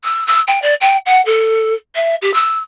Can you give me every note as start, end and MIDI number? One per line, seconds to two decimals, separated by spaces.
0.04 0.24 88
0.27 0.41 88
0.47 0.59 79
0.62 0.74 74
0.81 0.97 79
1.06 1.22 78
1.26 1.74 69
1.95 2.15 76
2.22 2.31 67
2.34 2.58 88